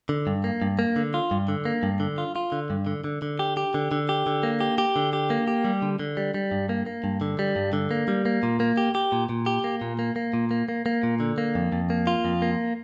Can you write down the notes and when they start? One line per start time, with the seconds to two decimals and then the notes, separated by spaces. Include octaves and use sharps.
0.09 D3
0.27 G2
0.44 A#3
0.62 G2
0.79 A#3
0.96 D3
1.14 F4
1.31 G2
1.48 D3
1.65 A#3
1.83 G2
2.00 D3
2.18 F4
2.36 F4
2.52 D3
2.70 G2
2.87 D3
3.04 D3
3.22 D3
3.39 G4
3.57 G4
3.74 D3
3.92 D3
4.09 G4
4.27 D3
4.43 A#3
4.60 G4
4.78 G4
4.96 D3
5.13 G4
5.30 A#3
5.48 G4
5.65 G3
5.82 D3
5.99 D3
6.17 G3
6.34 G3
6.51 G2
6.69 A#3
6.86 A#3
7.04 G2
7.21 D3
7.39 G3
7.56 G2
7.73 D3
7.91 A#3
8.08 G3
8.25 A#3
8.43 A#2
8.60 A#3
8.77 G4
8.95 G4
9.12 A#2
9.29 A#2
9.46 G4
9.64 A#3
9.81 A#2
9.99 A#3
10.16 A#3
10.34 A#2
10.51 A#3
10.69 A#3
10.86 A#3
11.03 A#2
11.20 D3
11.38 A#3
11.55 F2
11.72 F2
11.90 A#3
12.07 F4
12.25 F2
12.42 A#3